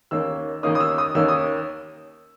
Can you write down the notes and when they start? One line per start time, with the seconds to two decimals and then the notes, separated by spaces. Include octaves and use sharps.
0.11 D#2 D#3 A#3 C#4 E6
0.63 D#2 D#3 A#3 C#4 D#6
0.75 D#6
0.80 E6
0.98 D#6
1.15 D#2 D#3 A#3 C#4 E6
1.28 D#6